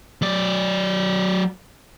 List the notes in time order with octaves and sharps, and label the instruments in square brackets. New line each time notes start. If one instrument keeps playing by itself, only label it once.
[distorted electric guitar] F#3 D5